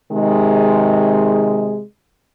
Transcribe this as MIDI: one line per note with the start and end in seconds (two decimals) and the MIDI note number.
0.12 1.81 48
0.12 1.81 51
0.12 1.81 56